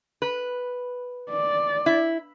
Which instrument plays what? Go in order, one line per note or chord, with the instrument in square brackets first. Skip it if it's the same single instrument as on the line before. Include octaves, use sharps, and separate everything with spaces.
[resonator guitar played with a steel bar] B4
[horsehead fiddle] D5
[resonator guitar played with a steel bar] E4